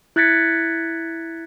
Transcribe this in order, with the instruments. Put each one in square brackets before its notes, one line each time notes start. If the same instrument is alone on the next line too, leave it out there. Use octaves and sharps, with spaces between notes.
[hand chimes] E4 F#6 G#6 A6 B6 C#7